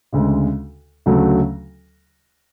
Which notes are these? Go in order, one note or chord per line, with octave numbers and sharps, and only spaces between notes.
D2 C#3 G#3
D2 C#3 F#3 A3